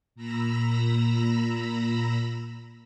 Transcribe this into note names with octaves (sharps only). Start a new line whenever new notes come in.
A#2 A#5 B5 E6 A#6